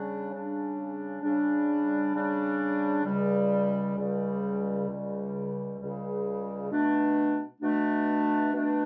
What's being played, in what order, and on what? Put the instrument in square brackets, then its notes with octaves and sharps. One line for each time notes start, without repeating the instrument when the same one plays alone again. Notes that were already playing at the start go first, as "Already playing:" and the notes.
Already playing: [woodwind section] C#3 G3 D4
C#3 G3 D4
C#3 G3 D4
C#3 G3 D4
C#2 C#3 G3
C#2 C#3 G3
C#2 C#3 G3
C#2 C#3 G3
B2 A3 D4
B2 A3 D4
B2 A3 D4